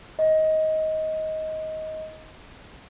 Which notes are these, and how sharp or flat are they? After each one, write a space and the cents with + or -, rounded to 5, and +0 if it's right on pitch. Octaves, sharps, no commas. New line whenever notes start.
D#5 +15